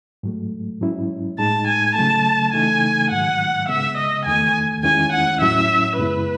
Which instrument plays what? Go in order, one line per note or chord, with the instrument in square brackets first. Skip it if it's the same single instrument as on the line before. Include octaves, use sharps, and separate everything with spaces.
[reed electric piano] G#2 F#3 A3
G#2 F#3 C#4 E4
[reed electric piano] A2 G#3 D#4 [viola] A5
[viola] G#5
[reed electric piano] C#3 F#3 A3 [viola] A5
[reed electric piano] C#3 E3 A3 D#4 [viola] G#5
[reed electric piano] G#2 D#3 F#3 [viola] F#5
[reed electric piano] C#3 G#3 B3 [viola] E5
[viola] D#5
[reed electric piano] E2 D#3 A3 [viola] G#5
[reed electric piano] E2 D#3 G#3 C#4 E4 [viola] G#5
[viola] F#5
[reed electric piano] A2 F#3 C#4 E4 [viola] E5
[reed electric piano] F#2 C#3 G#3 B3 E4 [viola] B4